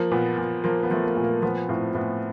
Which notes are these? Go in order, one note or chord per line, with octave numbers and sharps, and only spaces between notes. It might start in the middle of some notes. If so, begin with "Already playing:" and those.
Already playing: F3 A#3
A#2 B3
A#2
F3 A#3
B3
F3 A3
A#3
A#2 A3
A#3
F3 B3
A2 C4
A2 B3